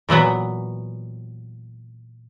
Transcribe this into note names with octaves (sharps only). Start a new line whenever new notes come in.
A#2 E3 F#3 B3